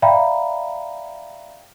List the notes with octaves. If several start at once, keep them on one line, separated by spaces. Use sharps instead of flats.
D5 E5 F5 G5 A#5 B5